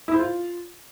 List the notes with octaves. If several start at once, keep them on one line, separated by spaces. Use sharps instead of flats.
E4
C5
F4